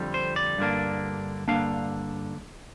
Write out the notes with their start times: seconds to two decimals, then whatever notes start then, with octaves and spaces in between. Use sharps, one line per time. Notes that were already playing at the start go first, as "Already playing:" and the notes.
Already playing: F2 D3 G3 C4
0.14 C5
0.36 D5
0.58 G2 D3 A#3 D4
1.48 G2 D3 A#3 D4 F5